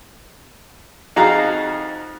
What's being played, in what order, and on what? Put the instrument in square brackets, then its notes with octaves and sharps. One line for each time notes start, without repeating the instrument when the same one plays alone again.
[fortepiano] F2 D#4 F#4 G#4 F5 A#5